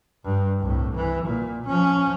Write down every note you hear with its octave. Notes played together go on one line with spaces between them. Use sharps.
G2
C2 A2
E3
A#2
F3 C#4